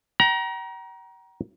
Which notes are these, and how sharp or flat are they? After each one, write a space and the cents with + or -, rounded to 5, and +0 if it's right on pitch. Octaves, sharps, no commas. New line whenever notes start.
G5 -40 A#5 +25